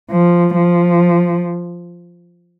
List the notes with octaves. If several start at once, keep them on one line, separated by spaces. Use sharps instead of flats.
F3
F3